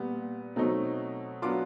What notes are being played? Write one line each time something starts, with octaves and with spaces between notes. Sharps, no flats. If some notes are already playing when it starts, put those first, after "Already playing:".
Already playing: A#2 G3 B3
B2 F#3 A3 C4 D#4
F#3 B3 D4 F4 C6 D6